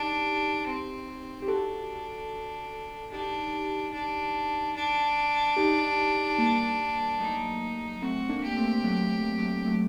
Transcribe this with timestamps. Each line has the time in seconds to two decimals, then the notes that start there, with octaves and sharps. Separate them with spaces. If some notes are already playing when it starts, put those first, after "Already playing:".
Already playing: D4 D#4 G4
0.67 C4
1.42 G4
1.48 D4 F#4 A4
3.11 D4 D#4 G4
3.93 D4
4.76 D4
5.56 D#4 G4
6.38 G3 A#3
7.20 F#3 A3 D#4
8.02 A3 C4 F#4
8.29 A#3 D4
8.43 G4
8.57 A3 C4
8.84 F#3 A3
9.38 F#3 A3
9.65 F#3 A3